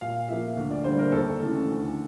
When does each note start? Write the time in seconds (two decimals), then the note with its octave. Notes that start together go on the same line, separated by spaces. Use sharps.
0.01 A#2 F5
0.29 F3 A#3 E5
0.57 D2
0.71 D5
0.84 D3 G3 A#3 C5
0.99 A#4
1.12 D#2 A4
1.40 C#3 E3 A3
1.68 D2